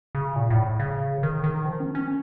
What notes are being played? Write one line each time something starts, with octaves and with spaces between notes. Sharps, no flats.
C#3
A#2
A2
C#3
D#3
D#3
F3
C#4
C#4